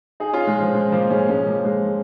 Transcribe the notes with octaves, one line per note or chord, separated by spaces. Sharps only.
D#4 G#4
C#4 F4
G#3
F3
G#3
F3 A#3
G#3 C#4
G#3 C#4
F3 A#3
G#3